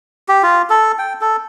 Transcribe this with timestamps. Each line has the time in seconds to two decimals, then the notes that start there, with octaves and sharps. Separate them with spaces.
0.28 G4
0.43 F4
0.70 A4
0.99 G5
1.21 A4